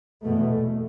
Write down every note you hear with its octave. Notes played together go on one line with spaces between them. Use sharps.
E2 B2 A3